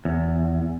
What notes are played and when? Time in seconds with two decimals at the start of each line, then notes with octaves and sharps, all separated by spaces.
0.05 E2